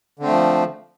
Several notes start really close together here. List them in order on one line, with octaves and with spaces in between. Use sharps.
D3 C4 A3 F3